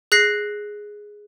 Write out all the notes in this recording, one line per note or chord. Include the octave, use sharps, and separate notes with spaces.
G#4 F#6 A#6 C7